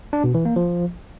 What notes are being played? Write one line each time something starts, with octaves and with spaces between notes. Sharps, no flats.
D4
B2
E3
A#3
F3